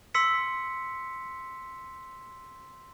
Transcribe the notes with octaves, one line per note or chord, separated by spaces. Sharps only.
C6 E6 B6 C#7